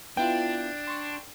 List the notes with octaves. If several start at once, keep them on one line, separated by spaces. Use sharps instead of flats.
B3 D4 E4 F4 G5
C6 C#6